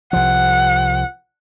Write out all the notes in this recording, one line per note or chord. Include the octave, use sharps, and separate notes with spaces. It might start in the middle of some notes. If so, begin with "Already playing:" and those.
C2 F3 F#5